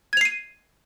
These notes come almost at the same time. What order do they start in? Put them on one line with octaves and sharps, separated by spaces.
G#6 F7 C7 D#7